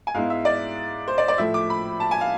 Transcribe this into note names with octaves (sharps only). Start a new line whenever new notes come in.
G#5
G#2 G#3 B3 E4 F5
E5
D5
C5
D5
D5
A2 F3 A3 E5
D6
B5
A5
G#5
F5